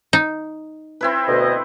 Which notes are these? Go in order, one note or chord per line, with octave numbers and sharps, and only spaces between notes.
D#4
C4 E4 B4
D2 B2 D#5